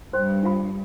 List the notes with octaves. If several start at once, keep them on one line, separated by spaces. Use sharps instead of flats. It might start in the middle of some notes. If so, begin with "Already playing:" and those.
G2 C5 G5 C6
D4 F4 C5 F5 B5